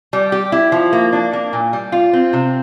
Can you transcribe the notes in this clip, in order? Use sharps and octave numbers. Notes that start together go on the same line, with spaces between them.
G3
G4
E4
F3
A#3
D4
A#3
A#2
G3
F4
C4
C3